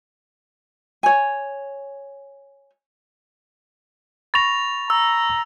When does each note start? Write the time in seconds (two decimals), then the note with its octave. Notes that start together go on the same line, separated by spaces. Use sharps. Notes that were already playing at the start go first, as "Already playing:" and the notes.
1.03 C#5 G#5
4.34 B5 C#6 A6 A#6 F7
4.90 A#5 E6